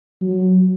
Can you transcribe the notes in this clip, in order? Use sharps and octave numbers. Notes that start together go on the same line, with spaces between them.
F#3